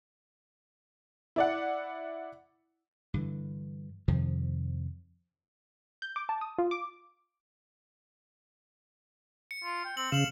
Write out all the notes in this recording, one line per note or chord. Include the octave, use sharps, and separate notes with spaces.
E4 D5 F#5
G2 D3 E3
F2 C3 D#3 F3
G6
D6
A5
D#6
F4
D6
C#7
F4
G5
C4 F#7
C#3 F5 E7 F#7